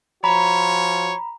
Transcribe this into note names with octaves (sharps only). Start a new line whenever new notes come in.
F3 F#4 C#5 A#5 B5